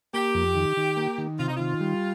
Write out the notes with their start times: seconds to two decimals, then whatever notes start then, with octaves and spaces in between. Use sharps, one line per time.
0.14 A#3 G4
0.35 F2
0.55 D#3
0.77 D#3
0.97 A#3
1.18 D#3
1.39 C3 F4
1.48 D#4
1.57 D#3 F4
1.81 G3